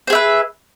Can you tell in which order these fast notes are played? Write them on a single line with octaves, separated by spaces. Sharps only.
C5 G#4 E5 B4